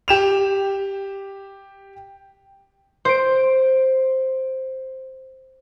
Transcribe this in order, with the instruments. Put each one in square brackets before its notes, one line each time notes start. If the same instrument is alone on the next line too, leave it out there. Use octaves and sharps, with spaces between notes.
[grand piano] G4 E7 F7
[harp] C5 D7